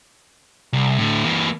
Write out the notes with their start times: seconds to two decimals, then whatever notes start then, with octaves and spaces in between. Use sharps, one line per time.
0.73 C2
0.98 A2 D3
1.25 E3 A#3